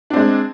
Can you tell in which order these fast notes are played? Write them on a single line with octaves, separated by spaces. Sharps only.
D4 C4 G#3